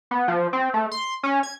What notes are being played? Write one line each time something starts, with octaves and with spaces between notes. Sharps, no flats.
B3
F3
C4
A3
C6
C#4
G#6